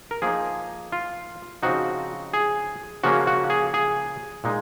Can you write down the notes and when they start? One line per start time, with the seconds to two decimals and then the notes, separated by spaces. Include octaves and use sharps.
0.11 A#4
0.22 F3 A#3 D#4 G#4
0.92 F4
1.63 C#3 F3 C4 D#4 F#4
2.34 G#4
3.04 C#3 F3 A#3 C#4 F#4
3.27 F#4
3.50 G#4
3.74 G#4
4.44 A#2 G#3 D#4